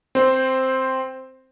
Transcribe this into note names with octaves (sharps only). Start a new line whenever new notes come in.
C4 C5